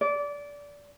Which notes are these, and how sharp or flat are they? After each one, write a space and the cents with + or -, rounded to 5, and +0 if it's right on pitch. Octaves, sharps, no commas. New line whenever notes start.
D5 -20